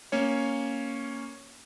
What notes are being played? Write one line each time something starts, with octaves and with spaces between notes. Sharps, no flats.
A#3 C#4 C#5